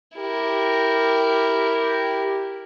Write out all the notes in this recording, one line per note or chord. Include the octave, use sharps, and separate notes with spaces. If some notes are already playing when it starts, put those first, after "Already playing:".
E4 G4 A#4